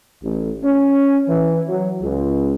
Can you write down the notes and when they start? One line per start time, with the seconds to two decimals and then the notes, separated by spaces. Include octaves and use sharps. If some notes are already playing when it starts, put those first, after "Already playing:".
0.23 A1
0.63 C#4
1.28 E3
1.68 F#3
2.01 C#2